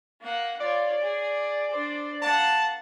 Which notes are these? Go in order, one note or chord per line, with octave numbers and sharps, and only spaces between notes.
A#3 F#5
F4 C#5 D5
G#4
D4 C5
A#3 F#5 A5